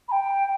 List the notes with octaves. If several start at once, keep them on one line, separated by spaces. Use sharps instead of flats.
B5
G5